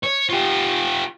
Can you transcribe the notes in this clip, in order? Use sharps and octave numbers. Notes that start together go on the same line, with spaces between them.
C#5
F4 G4